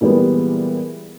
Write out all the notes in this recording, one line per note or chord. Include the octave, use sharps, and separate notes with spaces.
A#2 E3 G3 G#3 B3